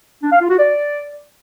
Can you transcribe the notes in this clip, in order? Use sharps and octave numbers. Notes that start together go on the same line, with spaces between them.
D4
F5
F4
F#4
D5